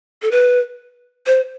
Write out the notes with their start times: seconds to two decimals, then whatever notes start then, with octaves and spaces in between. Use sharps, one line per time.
0.22 A4
0.31 B4
1.26 C5